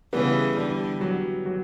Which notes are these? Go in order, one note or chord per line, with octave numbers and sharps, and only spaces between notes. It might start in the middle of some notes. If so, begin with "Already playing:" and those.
C#3 E3 G3 B3
D3 G3
F#3
F#3